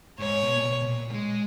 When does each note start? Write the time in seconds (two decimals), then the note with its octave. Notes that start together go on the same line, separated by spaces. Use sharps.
0.19 G#2 C#5
0.42 B2
0.54 A#2
0.65 B2
0.82 B2
0.88 A#2
1.10 G#3